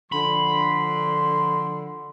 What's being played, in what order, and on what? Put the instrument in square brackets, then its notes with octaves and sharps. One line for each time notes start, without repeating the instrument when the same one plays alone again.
[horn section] D3 F3 C6 [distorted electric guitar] B5